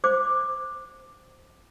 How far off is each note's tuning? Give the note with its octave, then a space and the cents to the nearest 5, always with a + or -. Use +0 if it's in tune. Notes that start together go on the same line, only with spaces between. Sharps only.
C5 +0 D6 +10